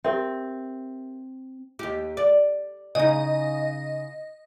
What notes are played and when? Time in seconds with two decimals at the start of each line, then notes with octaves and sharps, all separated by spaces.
0.04 C4 G4 A#4 E5
1.79 D#2 G4
2.17 D5
2.95 C#3 D#4 D#5